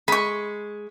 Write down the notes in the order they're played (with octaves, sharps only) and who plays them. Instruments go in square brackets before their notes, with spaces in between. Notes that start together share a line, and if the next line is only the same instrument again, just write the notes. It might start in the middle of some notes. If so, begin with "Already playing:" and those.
[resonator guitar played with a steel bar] G#3 [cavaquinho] B5 C#6